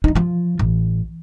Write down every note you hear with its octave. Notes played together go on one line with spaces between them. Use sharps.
G3 D#4
F3 F4
A1